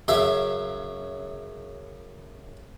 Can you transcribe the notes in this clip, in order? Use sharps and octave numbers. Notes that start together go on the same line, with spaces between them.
F#2 C#3 E5 F5